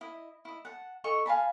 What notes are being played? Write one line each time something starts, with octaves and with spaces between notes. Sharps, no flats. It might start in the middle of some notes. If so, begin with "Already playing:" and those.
E4 D#5
E4 D#5
F#5 A5
D#4 A4 D#5 C#6
F5 G#5 A5 B5